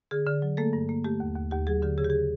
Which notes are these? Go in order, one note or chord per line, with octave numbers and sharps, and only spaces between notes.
D3 G#4
D3
F#3
A3 A#3 A4
G2
A#3
A3 G4
D#2
D#2
D#2 G4
F#3 G#4
D3 G4
C#3 G#4
G4
G#4